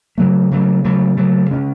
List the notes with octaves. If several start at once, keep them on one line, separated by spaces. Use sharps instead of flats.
C#3 F#3 A3
C#3 F#3 A3
C#3 F#3 A3
C#3 F#3 A3
C#3 G#3 C#4